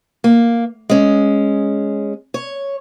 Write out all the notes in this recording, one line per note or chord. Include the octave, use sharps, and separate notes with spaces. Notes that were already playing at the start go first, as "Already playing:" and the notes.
A#3
G#3 C#4
C#5